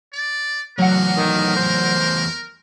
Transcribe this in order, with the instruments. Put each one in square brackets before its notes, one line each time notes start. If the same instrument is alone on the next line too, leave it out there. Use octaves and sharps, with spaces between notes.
[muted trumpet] D5
[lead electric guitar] E2 A3 [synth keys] F#3 F#5 [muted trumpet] A#4
[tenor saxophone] D#3
C5